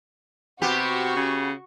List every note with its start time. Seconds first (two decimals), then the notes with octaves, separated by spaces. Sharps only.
0.62 C3 B3 F#4 G4 C#6
1.16 C#3